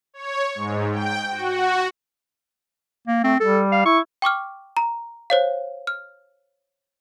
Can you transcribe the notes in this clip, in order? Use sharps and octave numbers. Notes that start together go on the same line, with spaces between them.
C#5
G#2
G5
F#4
A#3
A3 C4
G3 A4
F5
E4 C#6
G5 C#6 D6 F6
A#5
C5 C#5 F5
F6